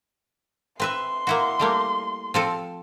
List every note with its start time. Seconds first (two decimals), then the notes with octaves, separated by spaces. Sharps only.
0.80 C4 B4 E5 C6
1.27 A#3 E4 F#4
1.60 G3 A3 A#3
2.34 F3 C4 A4